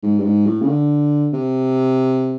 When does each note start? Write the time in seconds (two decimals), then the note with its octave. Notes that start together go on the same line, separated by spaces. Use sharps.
0.03 G#2
0.19 G2
0.25 G#2
0.46 A2
0.62 C#3
0.69 D3
1.33 C3